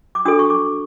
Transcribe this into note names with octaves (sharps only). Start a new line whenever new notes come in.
D6
D4 F#4 A4 D#6
C#6
D6